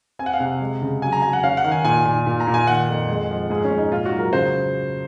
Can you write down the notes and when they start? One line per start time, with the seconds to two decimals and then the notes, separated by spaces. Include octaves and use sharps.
0.19 C4 G#5
0.26 F#5
0.33 F5
0.40 C3 F#5
0.61 G#3
0.81 C#3
1.02 F#3 G#5
1.12 A#5
1.22 F#3 G#5
1.33 F#5
1.43 C#4 F5
1.57 F#5
1.64 D#3
1.71 G#5
1.85 A#2 G#5
2.05 A#2
2.26 A#2
2.40 A#5
2.47 A#2
2.54 G#5
2.67 D#3 F#5
2.89 F2
3.08 G#3
3.29 F3
3.50 G#2 G#4
3.64 C#4
3.71 G#2
3.78 D#4
3.91 A#2 F4
4.05 F#4
4.12 F#3
4.19 A#4
4.33 C#3 C5